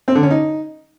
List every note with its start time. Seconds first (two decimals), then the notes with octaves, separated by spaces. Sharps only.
0.08 C4
0.15 D3
0.23 C#4
0.31 D#4